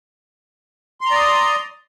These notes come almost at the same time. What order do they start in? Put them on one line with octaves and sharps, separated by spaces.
C6 A#5 D5 D#6